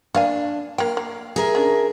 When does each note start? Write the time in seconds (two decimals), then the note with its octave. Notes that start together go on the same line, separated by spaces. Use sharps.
0.14 A#3 D4 F5 G#5
0.78 A#3 F5 G5
0.97 A#3
1.36 G#4 A#4 E5
1.55 C#4 D4